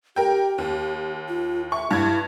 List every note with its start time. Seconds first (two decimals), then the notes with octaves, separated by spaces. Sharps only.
0.16 G4 A#4 G5
0.58 D#2
1.29 F4
1.72 E5 C#6
1.91 G2 E4 G#6